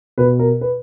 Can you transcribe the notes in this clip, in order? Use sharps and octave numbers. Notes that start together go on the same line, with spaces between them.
B2 B4
A#4
B4